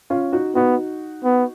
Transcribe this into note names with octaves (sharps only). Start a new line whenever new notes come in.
C#4 F4
D#4 F#4
B3 D#4 F#4
B3